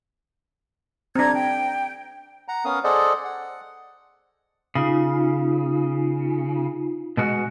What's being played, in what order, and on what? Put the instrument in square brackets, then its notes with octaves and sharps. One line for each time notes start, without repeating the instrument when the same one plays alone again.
[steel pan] C4 D4 [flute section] A#5 G#6
[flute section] G5
[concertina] F#5 A#5
B3 C#4 A#4 F5 D#6
G#4 A4 C5 D5 D#5 F#5
F#5
[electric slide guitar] C#3 [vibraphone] D#4 F4
[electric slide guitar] B2 G#3 F#4